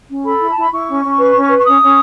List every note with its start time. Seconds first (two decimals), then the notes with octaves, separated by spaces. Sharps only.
0.10 C#4
0.25 A4 B5
0.41 E4
0.48 A5
0.56 E4 B5
0.71 E4 C#6
0.87 C#4
1.02 C#4
1.18 B4
1.34 C#4
1.49 B4
1.58 C#6
1.64 C#4 D#6
1.81 C#4